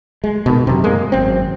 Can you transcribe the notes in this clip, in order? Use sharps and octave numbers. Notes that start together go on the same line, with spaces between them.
G#3
B2 D#3
F#2 C3
G#3 A#3
G#1 F#2 C4